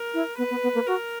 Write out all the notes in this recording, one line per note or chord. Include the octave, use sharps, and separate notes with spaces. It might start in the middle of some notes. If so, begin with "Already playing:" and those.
Already playing: A#4
E4
B3 B4
B3
B3
A#3
F#4 A#4